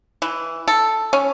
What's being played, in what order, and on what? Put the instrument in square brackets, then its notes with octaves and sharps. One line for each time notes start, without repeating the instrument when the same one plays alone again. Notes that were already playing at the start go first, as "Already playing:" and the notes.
[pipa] E3
A4
C#4